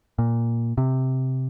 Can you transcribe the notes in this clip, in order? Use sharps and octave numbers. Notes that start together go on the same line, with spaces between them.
A#2
C3